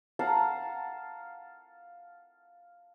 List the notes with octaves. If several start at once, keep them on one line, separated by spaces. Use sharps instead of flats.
F5 F#5 A5 A#5